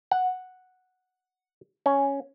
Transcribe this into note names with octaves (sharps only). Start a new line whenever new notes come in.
F#5
C#4